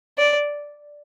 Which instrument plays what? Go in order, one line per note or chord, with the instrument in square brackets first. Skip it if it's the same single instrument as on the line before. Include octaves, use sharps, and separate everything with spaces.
[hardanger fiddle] D5